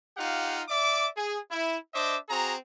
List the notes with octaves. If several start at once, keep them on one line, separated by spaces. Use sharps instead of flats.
D#4 F4 G4 F5 F#5
D5 E5 D6
G#4
E4
D4 C5 D#5 E5 D6
C4 F#4 G#4 A#5